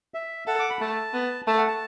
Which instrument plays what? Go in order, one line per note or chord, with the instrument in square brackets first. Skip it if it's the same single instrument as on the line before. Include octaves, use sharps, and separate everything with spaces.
[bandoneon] E5
[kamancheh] A4 [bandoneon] F#5
[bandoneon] D6
B5
[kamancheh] A3 [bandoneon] A5
[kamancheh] B3
[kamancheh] A3 [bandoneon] A5
[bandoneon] F#5
A5